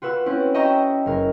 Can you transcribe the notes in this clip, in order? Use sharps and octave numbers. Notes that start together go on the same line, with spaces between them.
F4 F#4 B4 E6
C4 C#4 E4
D#5 E5 G5 A#5 C#6 E6
F#1 A#4